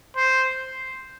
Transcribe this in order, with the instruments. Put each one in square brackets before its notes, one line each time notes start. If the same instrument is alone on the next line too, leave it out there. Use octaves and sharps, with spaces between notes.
[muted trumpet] C5